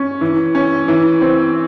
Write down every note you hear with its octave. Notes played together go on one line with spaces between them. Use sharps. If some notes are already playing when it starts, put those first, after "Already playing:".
Already playing: C#4
E3
C#4
E3
C4